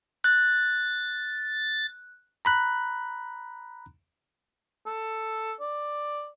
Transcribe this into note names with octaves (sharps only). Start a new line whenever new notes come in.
F#6 A6
A#5 B5 F#6
A4
D5